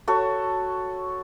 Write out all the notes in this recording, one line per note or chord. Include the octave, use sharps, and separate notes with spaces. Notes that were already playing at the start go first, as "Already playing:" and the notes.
F#4 A4 C#5